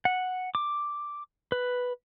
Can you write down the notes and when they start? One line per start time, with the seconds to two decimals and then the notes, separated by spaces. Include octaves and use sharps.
0.05 F#5
0.55 D6
1.52 B4